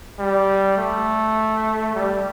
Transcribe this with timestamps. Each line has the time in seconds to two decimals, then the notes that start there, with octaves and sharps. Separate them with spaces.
0.19 G3
0.77 A3
1.95 G3